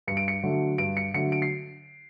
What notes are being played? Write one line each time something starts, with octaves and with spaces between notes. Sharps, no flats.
G2 C#7
D7
C#7
D3 F#3 A3
G2 D7
C#7
D3 F#3 A3 C#7
D7
C7